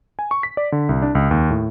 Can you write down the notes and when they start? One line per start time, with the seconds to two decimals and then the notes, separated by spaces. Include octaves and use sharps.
0.19 G#5
0.31 C#6
0.43 B6
0.57 D5
0.72 D3
0.89 C2
1.02 D4
1.15 C#2
1.31 D#2
1.50 A2